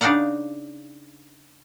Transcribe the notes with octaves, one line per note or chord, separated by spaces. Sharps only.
C#3 D4 D#4 F5 F#5 A#5